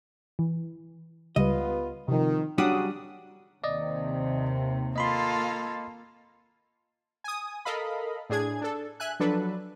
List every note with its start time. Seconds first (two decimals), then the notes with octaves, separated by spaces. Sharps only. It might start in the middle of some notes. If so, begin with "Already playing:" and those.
0.39 E3
1.36 C#2 G3 B3 F4 B4 D#5
2.08 C3 D#3 F3
2.58 C#3 F#3 G3 D4 F#4 D#6
3.64 D#2 C3 D5 D#5
4.96 A#3 F4 A4 D#5 B5 C6
7.24 G#5 D#6
7.65 A4 A#4 D#5 F5 B5
8.30 A2 D4 G#4 G#6
8.61 D4 A4
9.00 E5 G#5 F#6
9.20 F3 F#3 D4 A4 B4